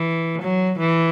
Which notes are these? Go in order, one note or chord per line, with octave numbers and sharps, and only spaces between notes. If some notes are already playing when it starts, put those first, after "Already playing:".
Already playing: E3
F#3
E3